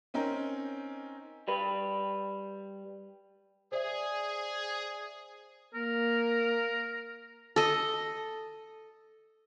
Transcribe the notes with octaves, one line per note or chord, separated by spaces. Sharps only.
C4 C#4 D#4 A#4
G3 B4
G#4 C5 D5 E5
A#3 A#4
A4 D#5